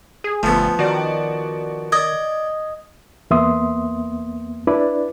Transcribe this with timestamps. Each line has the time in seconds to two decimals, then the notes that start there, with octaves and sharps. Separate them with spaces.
0.24 G#4
0.43 G1 F3 A3 B3 A4
0.79 D#3 F#4 D5
1.92 D5 D#5 G#6
3.31 E2 A#3 B3 E5 C6 D#6
4.67 D4 E4 B4 D5